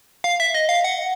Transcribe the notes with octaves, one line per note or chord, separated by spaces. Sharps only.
F5
E5
D#5
F5
F#5